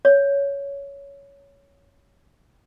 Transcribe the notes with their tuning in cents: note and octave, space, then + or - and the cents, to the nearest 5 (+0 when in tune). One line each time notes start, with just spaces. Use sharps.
C#5 +10